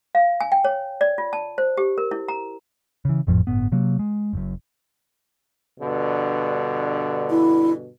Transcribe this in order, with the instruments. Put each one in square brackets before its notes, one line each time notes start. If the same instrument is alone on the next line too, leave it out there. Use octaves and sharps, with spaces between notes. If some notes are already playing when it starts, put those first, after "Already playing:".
[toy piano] F5
G#5
G5
C#5
D5
F4
A5
C5
G4
A#4
E4
A#5
[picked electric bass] C#3 E3
G#1 F2 A2 F3
G1 A2 B3
C3 F#3 A#3
G#3
F#1 F#2
[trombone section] G2 B2 D3
[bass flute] E4